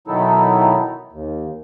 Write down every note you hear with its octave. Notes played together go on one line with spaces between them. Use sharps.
B2 D#3 F#3 D#4 E4 A4
D#2